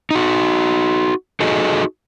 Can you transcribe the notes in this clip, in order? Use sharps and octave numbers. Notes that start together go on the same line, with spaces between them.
D#4 F#4
D#4 F#4 G#4 A4 D#5